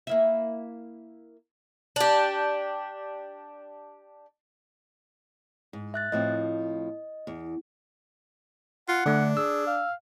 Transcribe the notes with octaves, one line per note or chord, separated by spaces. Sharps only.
A#3 E4 E5
D4 G4
G#2
E5 F#6 A6
A2 F3 C4 D#5
E2
F4 F#5
D3 A3 D4
G#4 E6
F5